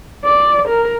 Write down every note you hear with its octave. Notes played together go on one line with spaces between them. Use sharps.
D5
A#4